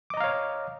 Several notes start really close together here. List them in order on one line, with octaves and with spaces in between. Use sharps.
D6 D#5 A#5 F5 C#5